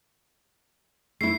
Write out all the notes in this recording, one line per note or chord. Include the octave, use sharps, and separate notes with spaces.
A3 E4 C7